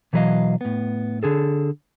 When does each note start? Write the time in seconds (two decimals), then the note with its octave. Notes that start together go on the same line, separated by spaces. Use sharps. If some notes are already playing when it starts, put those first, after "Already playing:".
0.13 B2 E3 F#3 B4 D#5 F5
0.61 A2 B3
1.23 D3 G#4 A4